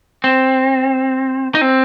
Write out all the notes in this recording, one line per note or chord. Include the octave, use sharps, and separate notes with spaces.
C4
D#4
C4